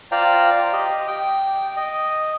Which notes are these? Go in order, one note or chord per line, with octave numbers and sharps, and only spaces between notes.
F4 C5 D5 F5 G5 A#5
G4 D#5
G5
D#5